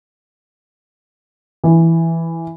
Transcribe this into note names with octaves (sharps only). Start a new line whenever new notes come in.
E3